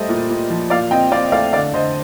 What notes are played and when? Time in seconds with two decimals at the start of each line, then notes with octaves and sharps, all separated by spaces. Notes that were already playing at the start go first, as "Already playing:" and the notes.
Already playing: G3 A3 C5 D#5
0.09 A#2
0.30 A#2
0.50 F3
0.70 A#2 D5 F5
0.91 C4 D#5 G5
1.12 C4 D5 F5
1.25 D#5
1.32 A3 D5 F5
1.53 D3 D5 F5
1.73 D3 C5 D#5